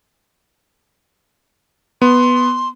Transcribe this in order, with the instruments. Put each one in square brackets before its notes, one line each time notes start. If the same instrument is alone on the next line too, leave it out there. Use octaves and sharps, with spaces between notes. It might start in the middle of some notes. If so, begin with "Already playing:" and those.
[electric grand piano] B3 [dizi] C6